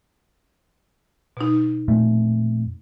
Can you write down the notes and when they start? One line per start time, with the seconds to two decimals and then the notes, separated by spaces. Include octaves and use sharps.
1.37 B2 D#4
1.88 F2 A#2 A3